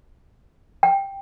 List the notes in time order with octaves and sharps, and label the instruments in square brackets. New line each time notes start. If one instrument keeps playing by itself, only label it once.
[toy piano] G5